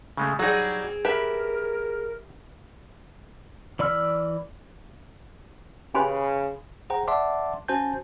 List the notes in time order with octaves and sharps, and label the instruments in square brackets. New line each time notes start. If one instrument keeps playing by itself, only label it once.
[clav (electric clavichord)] C#3 G#3 A3
[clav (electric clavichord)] F#3 D#4 [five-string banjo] G3 F#4 [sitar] C4 G#4
[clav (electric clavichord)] G4 E5 [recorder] A#4 [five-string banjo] B4
[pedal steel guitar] E3 D5 B5 E6 F6
[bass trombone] C#3 [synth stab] C#4 G4 B4 [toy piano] G#5 B5 C6
[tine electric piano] G#4 C5 F#5 G5 A#5
D5 E5 F#5 A5 C6 D6
C#4 F#4 C5 G#5 A5 G6